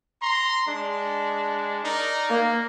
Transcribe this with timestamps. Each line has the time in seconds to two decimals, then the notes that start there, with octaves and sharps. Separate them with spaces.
0.22 A#5 C6
0.66 G#3 D4
1.84 D#4 A#4 D5
2.30 A#3